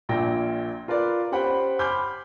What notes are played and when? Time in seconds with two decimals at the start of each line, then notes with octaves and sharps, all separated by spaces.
0.09 A#1 A#2 G5 A#6
0.88 F4 A#4 B4 D5
1.32 C#4 G4 C5 F#5 G5 B5
1.79 G#5 B5 C6 D6 F6 G6